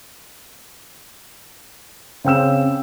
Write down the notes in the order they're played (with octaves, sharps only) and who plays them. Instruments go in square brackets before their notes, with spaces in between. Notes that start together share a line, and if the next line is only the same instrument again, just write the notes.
[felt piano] C#3 C4 G5 E6 E7